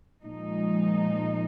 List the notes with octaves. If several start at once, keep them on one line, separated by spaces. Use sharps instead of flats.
A#2 F3 G#3 D#4